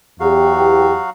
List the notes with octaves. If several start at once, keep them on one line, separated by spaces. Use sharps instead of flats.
E2 F#3 F#4 G4 F5